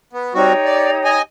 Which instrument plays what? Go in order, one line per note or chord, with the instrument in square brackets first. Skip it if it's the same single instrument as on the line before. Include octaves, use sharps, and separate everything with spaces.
[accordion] B3
[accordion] G3 C4 F#4 [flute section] D#4 G4 C#5
[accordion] D5
D#5 G#5